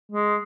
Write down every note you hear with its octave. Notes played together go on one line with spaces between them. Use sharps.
G#3